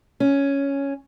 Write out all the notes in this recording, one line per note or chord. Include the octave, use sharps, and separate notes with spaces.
C#4